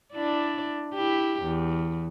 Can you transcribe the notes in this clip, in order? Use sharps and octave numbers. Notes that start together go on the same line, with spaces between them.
D4 E4 D5
E4 G4
E2